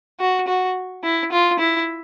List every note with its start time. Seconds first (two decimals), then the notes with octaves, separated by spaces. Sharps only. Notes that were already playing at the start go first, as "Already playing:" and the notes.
0.20 F#4
0.47 F#4
1.03 E4
1.32 F4
1.59 E4